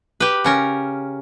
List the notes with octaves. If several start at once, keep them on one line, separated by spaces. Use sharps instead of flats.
G4 B4
C#3 C#4 A#4